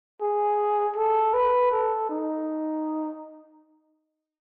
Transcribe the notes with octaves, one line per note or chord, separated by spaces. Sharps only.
G#4
A4
B4
A4
D#4